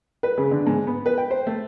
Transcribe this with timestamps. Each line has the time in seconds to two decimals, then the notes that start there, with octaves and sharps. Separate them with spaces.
0.23 B4
0.38 C#3
0.51 D3
0.67 G#2
0.87 B3
1.06 B4
1.18 G5
1.31 C5
1.47 A3